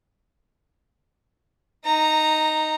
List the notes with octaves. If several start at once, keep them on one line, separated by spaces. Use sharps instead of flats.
D#4 A#5